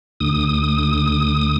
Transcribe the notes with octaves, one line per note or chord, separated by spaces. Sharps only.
D2 D#6